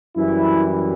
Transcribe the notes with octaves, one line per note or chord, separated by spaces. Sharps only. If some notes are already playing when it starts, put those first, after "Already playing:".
F#2 E3 G3 E4